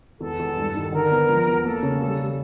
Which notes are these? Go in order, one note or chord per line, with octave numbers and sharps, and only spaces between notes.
E2 A4
E2
G2
D#3
D3 A#4
B3
F3
E2
A#3 A4
C#3
G3
G3